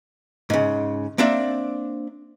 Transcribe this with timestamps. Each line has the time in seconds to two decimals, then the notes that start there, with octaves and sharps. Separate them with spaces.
0.50 G#2 C#3
1.18 A#3 C4 D4 D5 E5